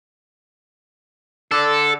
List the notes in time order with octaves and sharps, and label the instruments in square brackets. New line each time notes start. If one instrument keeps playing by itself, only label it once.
[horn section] D3 [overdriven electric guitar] A4